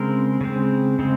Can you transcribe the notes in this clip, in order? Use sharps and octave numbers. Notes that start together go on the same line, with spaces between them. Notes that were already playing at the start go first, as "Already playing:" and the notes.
Already playing: C#3 G#3 C4 A#4
C#3 G#3 C4
C#3 G#3 C4